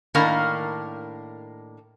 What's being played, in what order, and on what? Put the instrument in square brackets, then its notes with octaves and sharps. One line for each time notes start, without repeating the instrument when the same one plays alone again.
[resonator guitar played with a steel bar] A2 D#3 A#3 D4 A#4